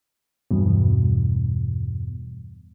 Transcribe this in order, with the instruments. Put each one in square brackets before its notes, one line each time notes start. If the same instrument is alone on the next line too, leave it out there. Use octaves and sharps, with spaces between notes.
[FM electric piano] E2 G2 B2